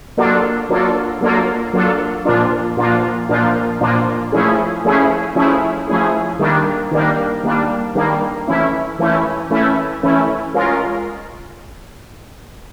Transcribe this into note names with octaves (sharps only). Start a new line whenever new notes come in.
F#3 A#3 D4 F4 A4
F#3 A#3 D4 F4 A4
F#3 A#3 D4 F4 A4
F#3 A#3 D4 F4 A4
A#2 F3 A#3 D4 F4
A#2 F3 A#3 D4 F4
A#2 F3 A#3 D4 F4
A#2 F3 A#3 D4 F4
F3 A3 C#4 E4 G#4
F3 A3 C#4 E4 G#4
F3 A3 C#4 E4 G#4
F3 A3 C#4 E4 G#4
D#3 G3 A#3 D4
D#3 G3 A#3 D4
D#3 G3 A#3 D4
D#3 G3 A#3 D4
E3 A3 C#4 E4
E3 A3 C#4 E4
E3 A3 C#4 E4
E3 A3 C#4 E4
G#3 C#4 F4 A#4